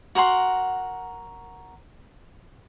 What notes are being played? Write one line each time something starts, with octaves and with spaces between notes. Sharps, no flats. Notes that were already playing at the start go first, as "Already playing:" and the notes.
F#4 A#4 F#5 C6